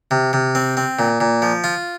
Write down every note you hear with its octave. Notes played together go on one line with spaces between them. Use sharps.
C3
C3
C4
C4
A#2
A#2
F3
F4